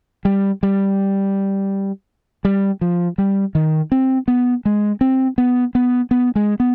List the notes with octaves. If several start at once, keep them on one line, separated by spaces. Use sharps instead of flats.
G3
G3
G3
F3
G3
D#3
C4
B3
G#3
C4
B3
B3
B3
G#3
B3